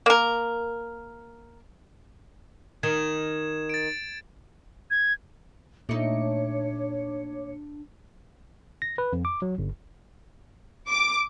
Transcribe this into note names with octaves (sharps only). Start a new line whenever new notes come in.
A#3 A#4
D#3 G#6 E7
A6 D7
G#6
A#2 A3 D4 D#4 C#5 D6 C#7
A#6
B4
F2
D6
F#3
G1
D6